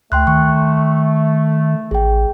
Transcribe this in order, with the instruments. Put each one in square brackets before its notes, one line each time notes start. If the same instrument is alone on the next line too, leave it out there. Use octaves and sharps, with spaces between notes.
[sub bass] D2 [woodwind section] A3 [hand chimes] G5 C6 F#6
[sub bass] D#3 [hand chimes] C#6
[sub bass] A1 [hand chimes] G#4 G5